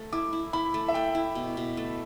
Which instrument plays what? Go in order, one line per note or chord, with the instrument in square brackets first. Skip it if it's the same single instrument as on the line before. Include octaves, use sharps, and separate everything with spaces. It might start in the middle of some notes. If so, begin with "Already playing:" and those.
Already playing: [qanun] A3
[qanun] E4 [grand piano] D6
[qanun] E4
[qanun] E4 [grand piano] B5
[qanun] A3
[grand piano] E5
[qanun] A3 [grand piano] G5
[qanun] E4
B2
B2
A3